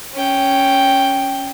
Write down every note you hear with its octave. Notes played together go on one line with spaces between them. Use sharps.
C#4 G5